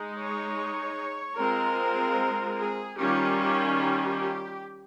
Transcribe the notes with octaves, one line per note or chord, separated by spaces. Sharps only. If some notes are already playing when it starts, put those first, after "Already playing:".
Already playing: G#3 D#4
C#5
G#3 C4 F4 A#4
G#4
D#3 G3 C#4 F4 G4
G4
G4